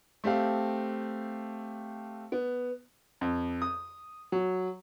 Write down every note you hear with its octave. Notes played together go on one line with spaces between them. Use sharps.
A3 C4 G4 F5
B3
F2
D#6
F#3